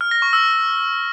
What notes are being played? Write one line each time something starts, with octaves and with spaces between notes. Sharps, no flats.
F6
A#6
C#6
E6